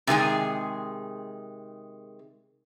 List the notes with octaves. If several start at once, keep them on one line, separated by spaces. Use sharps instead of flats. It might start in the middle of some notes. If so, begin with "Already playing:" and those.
C3 D#3 G#3 G#4